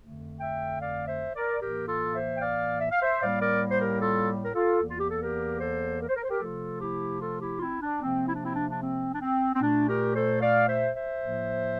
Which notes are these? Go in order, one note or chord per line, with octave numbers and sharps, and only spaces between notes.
F2 D3 A3
E5 G5
D5 F5
C5 E5
A#4 D5
A2 E3 A#3 G4 A#4
F4 A4
C5 E5
G5
D5 F5
E5
F5
C5 E5
A2 G3 A#3 D5 F5
A#4 D5
C5
G4 A#4
F4 A4
A#4
F4 A4
E2 E3 A#3
F4
G4
A4
G4 A#4
A4 C5
A#4
C5
A#4
C5
G4 A#4
C3 F3 A3 F4 A4
E4 G4
F4 A4
E4 G4
F4
C4 E4
D4
C3 F3 A#3 C4
E4
D4
C4 E4
D4
D4
C4
D4
C4
C4
A#2 A3 D4
G4 A#4
A4 C5
D5 F5
C5 E5
C5 E5
A2 F3 A#3